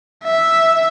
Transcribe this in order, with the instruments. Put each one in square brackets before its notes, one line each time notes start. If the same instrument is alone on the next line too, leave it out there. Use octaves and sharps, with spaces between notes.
[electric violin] E5